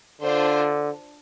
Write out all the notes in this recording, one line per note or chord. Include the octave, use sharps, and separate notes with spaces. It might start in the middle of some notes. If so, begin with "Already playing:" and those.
D3 D4 F4 C5